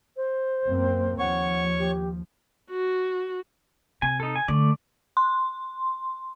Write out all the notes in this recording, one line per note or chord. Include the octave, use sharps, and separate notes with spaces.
C5
F#2 A#3 C4
D#2 F3 C#5 F#5 C#6
G4
F#4
C3 G#5
D#4 A4
G#5
D3 A3 D5
C6